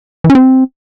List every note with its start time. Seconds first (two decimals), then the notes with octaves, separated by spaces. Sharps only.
0.24 E3
0.30 C#4
0.35 C4